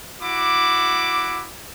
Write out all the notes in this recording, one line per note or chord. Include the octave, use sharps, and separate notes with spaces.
E4 F#4 D6